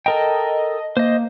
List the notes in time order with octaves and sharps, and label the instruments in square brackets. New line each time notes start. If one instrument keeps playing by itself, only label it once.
[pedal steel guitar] A4 A#4 G5 [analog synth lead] D#5
[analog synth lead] A#3 [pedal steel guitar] C5 D#5